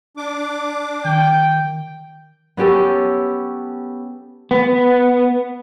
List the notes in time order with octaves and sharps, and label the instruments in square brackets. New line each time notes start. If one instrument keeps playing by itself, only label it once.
[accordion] D4 D6
[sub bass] D#3 [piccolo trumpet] G5
[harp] B3 C#4 G4 A4
[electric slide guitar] B3